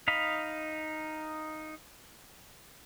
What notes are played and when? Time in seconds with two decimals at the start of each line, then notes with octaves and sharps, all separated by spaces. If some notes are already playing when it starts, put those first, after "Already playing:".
0.08 D#4 D#5 F5 B5